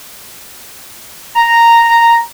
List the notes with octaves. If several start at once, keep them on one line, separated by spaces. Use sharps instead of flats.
A#5